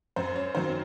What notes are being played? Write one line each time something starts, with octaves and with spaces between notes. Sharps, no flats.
F#2 C5
C#5
D#3 F#3 C5